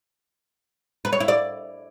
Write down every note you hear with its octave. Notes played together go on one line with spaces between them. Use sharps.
B4
C#5
E4
D5